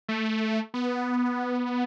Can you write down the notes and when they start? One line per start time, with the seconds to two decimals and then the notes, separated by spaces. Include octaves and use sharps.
0.09 A3
0.74 B3